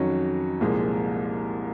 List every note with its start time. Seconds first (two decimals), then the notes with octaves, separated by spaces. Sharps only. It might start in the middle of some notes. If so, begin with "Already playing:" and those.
Already playing: F2 D#3 F#3 C#4 F#4
0.61 C2 A#2 F3 G#3